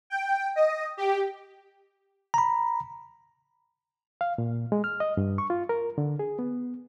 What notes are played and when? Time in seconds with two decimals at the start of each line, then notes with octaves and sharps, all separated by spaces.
0.10 G5
0.56 D#5
0.97 G4
2.34 A#5 B5
4.21 F5
4.38 A#2
4.72 G#3
4.84 F6
5.00 D#5
5.17 G2
5.38 C#6
5.50 F4
5.69 A#4
5.98 D3
6.19 G#4
6.39 B3